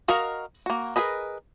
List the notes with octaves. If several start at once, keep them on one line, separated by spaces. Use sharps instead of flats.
F#4 A#4 D#5 F5
A#3 F#4
G#4 A#4 B4 D#5